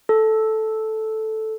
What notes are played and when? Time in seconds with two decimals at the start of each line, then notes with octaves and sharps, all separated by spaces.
0.09 A4